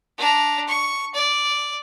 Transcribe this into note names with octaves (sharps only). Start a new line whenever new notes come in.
D4 A#5
C#6
D5